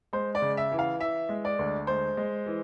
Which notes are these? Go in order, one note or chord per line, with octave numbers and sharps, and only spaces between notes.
G#3 C5
D5
C#3
E5
E3
F5
E3 E5
G#3
D5
D2
G#3 C5
G#3
E3